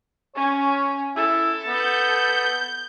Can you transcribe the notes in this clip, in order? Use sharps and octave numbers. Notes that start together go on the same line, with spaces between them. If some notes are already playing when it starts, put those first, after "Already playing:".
C#4 C#5
E4 A4
B3 G6